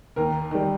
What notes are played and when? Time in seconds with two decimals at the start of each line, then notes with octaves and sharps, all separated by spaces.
0.16 D#2 A#4
0.51 D#3 G3